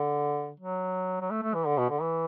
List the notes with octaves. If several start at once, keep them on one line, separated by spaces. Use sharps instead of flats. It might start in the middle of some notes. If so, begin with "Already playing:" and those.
Already playing: D3
F#3
F#3
A3
A3
E3
D3
B2
D3
E3